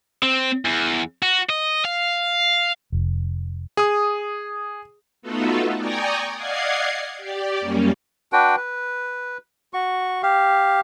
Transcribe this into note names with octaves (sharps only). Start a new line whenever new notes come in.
C4
E2
F#4
D#5
F5
F1
G#4 D#6
A3 B3 D#4 F4 F#4 A4
D5 G5 G#5 A#5 C#6 D#6
D5 D#5 F5 F#5 G#6 C7
G4 D5
F#2 G3 A#3 C#4
D4 F#4 B4 G5
B4
F#4 C#6
G4 F5